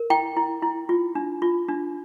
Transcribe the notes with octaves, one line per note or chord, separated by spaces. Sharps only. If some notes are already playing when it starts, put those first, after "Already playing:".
Already playing: A#4
E4 G5
E4
E4
F4
D4
F4
D4